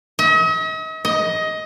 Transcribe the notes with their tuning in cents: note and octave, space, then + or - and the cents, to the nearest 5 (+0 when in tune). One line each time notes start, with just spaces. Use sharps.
D#5 +45
D#5 +15